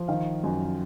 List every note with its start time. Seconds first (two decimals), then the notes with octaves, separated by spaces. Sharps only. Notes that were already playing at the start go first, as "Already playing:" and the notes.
Already playing: F3
0.08 D#3 F5
0.44 F#2